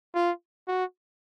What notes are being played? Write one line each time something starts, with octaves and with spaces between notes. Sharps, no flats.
F4
F#4